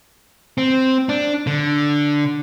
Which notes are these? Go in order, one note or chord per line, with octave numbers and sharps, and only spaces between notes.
C4
D4
D3